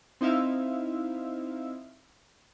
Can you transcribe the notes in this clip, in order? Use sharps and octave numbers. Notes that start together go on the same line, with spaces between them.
C4 D#4 E4 E5 F5